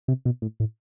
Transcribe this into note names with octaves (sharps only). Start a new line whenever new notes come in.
C3
B2
A2
A2